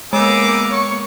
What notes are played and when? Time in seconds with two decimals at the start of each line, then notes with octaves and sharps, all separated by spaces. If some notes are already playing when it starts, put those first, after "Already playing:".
0.13 G#3 A#3 B3 D#4 G#4 D6 E6
0.70 C#5 C#6